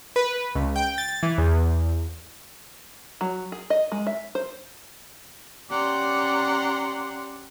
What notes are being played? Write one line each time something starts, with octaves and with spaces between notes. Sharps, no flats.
B4
C#2
G5
A6
E3
E2
F#3
G#4
D#5
G#3
E5
C5
C#4 G4 D5 F#5 A#5 C6